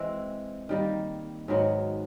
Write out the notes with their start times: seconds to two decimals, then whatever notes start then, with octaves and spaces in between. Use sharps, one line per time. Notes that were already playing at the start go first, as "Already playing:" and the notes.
Already playing: E3 G#3 C4
0.69 D#3 G3 A#3
1.48 G#2 D#3 F#3 B3